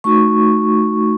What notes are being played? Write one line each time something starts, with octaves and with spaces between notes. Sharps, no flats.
A3 D#4 F#4 C#6